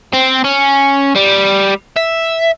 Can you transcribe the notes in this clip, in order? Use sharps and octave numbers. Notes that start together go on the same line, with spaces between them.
C4
C#4
G3
E5